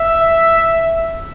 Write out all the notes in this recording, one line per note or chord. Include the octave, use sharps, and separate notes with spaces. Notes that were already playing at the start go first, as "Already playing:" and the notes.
Already playing: E5